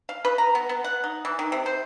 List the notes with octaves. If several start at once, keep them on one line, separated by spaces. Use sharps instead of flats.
F5
B4
A#5
B3
B3
F#5
D#4
E3
D#3
C3
C5